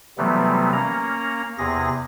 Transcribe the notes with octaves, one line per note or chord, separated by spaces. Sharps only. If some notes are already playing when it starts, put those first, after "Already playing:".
C3 E3 F#3 G3 A3 B3
A#3 C#4 A#5
E2 C3 G#4 A#6